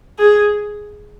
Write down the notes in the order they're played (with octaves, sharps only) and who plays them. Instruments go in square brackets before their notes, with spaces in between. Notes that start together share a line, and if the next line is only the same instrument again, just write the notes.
[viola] G#4